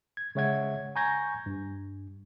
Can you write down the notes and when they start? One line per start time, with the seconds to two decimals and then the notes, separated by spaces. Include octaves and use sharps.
0.17 G#6
0.35 C#3 G#3 C#5 E5 F#5 G#6
0.96 G#5 A#5 C#6 G6 G#6 A#6
1.46 G2